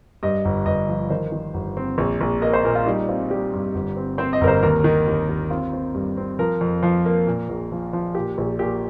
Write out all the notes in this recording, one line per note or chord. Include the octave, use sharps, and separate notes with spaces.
G2 D#5
G1
G1 D#5
F3
D#3 C5
D#3
G1
C4
A#1
A#1
A#3 D#5
C5
A#2 A#4
F4
G3 D#4
C4 F4
G3 G4
G2
G1
C4
C4 C5
D#5
G1 A#4
C5
D#2 A#4
D#3
D#2
D#2
C4 F4
C4
G2
C4
F3 A#4
F2
F3
A#3
A#2
A#1
F3
F3
A#2 G4
A#1
A#2 G4